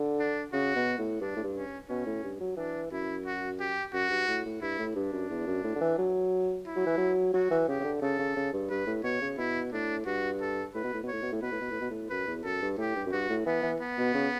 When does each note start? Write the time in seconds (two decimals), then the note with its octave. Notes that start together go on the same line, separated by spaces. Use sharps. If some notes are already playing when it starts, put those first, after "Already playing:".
Already playing: D3
0.19 D4
0.53 C#3 F#4
0.76 B2
0.98 A2
1.21 G2 D4
1.36 A2
1.44 G2
1.55 C#4
1.89 B2 C#4
2.06 A2
2.24 G2
2.40 F#3
2.57 E3 D4
2.91 F#2 E4
3.26 F#4
3.60 G4
3.93 F#2 F#4
4.10 G2
4.28 A2
4.45 A2
4.61 G2 E4
4.79 A2
4.95 G2 D4
5.13 F#2
5.29 E2
5.47 F#2
5.64 A2
5.75 D3
5.81 E3
5.98 F#3
6.66 E4
6.76 F#3
6.86 E3
6.97 F#3
7.34 F#3 F#4
7.51 E3
7.68 C#3 G4
7.80 C#3
7.84 D3
8.02 C#3 A4
8.19 C#3
8.36 C#3
8.53 G2
8.69 G2 B4
8.87 A2
9.03 B2 C#5
9.21 C#3
9.38 B2 E4
9.72 A2 D4
10.06 G2 F#4
10.41 A4
10.74 A2 B4
10.84 B2
10.94 A2
11.03 B2
11.08 A2 C#5
11.22 B2
11.32 A2
11.42 B2 B4
11.52 A2
11.61 B2
11.71 A2
11.81 B2
11.90 A2
12.10 F#2 B4
12.27 E2
12.44 F#2 A4
12.62 G2
12.78 A2 G4
12.95 G2
13.06 F#2
13.12 G2 F#4
13.30 A2
13.46 E3 B3
13.63 E3
13.80 B3
13.98 B2
14.14 C#3